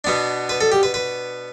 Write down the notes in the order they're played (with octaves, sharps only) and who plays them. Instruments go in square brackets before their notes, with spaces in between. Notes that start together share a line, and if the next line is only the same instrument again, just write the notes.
[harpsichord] B2 B3 D4
B4
A4
G4
B4
B4